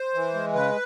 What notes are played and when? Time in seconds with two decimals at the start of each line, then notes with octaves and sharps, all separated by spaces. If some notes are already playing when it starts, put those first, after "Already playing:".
Already playing: C5
0.14 E3
0.34 G#3
0.54 C#3 B4